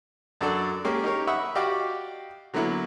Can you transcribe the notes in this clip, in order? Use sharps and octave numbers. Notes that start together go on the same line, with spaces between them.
F#2 D4 F#4 A4 D5
G#3 A#3 C#4 G4
D#4 G4 A#4 C#5
E5 F#5 B5 C#6 D#6
F#4 G4 D5 D#5 F5 G5
D3 F#3 A#3 B3 E4